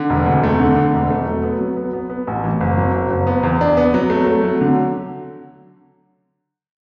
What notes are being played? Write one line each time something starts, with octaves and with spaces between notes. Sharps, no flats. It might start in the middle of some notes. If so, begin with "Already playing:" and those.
Already playing: D3
E1
D2
A3
D3
D3
E1
A3
F#3
B3
F#3
B3
B3
B3
A1
E3
F#1
F#3
F#1
F#1
B3
E2
D4
B3
F#3
A3
A3
F#3
D3